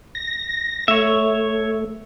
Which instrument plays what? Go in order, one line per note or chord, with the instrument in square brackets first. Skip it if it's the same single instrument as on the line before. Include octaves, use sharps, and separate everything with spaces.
[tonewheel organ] A#6
[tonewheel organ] A3 [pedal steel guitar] C#5 E5